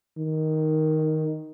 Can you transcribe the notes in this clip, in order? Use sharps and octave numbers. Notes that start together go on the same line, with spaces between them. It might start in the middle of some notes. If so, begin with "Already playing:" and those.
D#3